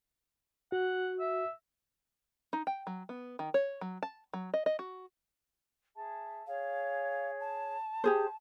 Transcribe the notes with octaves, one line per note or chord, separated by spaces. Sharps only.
F#4 F#5
E5
D#4
G5
F#3
B3
D#3
C#5
F#3
A5
F#3
D#5
D#5
F#4
G#4 E5 A5
G#4 C#5 F5
A5
G4 G#4 C5